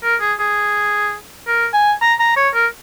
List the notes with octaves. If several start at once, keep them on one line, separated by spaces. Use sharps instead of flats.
A#4
G#4
G#4
A#4
G#5
A#5
A#5
C#5
A#4